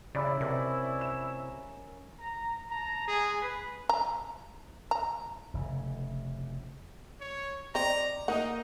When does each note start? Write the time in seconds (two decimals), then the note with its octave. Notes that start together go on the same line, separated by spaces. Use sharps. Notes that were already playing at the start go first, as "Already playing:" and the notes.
0.15 C#3 E4 D5 B5
0.41 C3 C#4 A#4 D#5
1.01 E7
2.20 A#5
2.70 A5 A#5
3.08 G#3 G#4
3.42 B4
3.89 A#5
4.91 A#5
5.54 F1 C#3
7.20 C#5
7.75 C4 D5 D#5 A#5
8.28 A#3 D#4 D#5 F#5